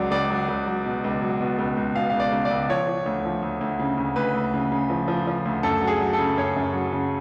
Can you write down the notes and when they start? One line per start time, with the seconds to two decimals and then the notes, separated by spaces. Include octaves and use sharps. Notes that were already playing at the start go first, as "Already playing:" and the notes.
Already playing: C#2 F#3 D5
0.11 C#2 D5
0.30 F#3
0.48 C#2
0.66 F#3
0.86 B2
1.04 C#2
1.22 F#3
1.41 B2
1.59 C#2
1.77 C#2
1.95 B2 F5
2.10 C#2 F5
2.20 D5
2.33 C#2
2.45 D5
2.51 C#2
2.69 F3 C#5
2.87 F3
3.06 D2
3.25 F3
3.42 D2
3.61 D2
3.79 C#3
3.98 D2
4.16 D2 B4
4.34 D2
4.54 C#3
4.72 C#3
4.90 F3
5.08 F3
5.27 F3
5.45 D2
5.63 F#2 A4
5.81 F#3
5.87 G#4
6.01 F#3
6.13 A4
6.19 C#3
6.37 F#2 C#5
6.56 F#2
6.74 F#3
6.93 C#3